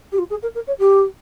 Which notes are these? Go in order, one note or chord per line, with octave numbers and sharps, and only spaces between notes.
G4
F4
G#4
A#4
A#4
C#5
G4